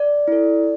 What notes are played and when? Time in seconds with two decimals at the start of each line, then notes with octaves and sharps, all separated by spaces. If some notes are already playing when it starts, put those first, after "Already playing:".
Already playing: D5
0.28 E4 A4